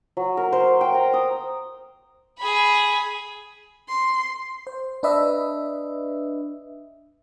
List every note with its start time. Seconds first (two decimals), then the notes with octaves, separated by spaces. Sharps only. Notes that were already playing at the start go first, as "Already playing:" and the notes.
0.17 F#3
0.37 A#4
0.53 C5
0.81 G5
0.94 A#5
1.14 D#6
2.38 G#4 B5
3.89 C6
4.67 C5
5.03 D4 B4 D#5 E5